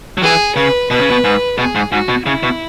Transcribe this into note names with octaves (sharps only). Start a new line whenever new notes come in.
F#3
E3 G#4
C#3 B4
B2 B4
C#3
B2
G#2
B2 G#4
G#2
G#2 F#4
B2
C#3 E4
B2